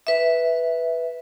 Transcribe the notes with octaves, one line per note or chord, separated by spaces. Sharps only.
B4 E5